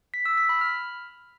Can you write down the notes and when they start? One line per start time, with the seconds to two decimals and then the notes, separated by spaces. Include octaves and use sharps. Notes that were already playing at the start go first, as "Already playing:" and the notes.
0.14 B6
0.25 E6
0.37 B6
0.49 B5
0.61 F6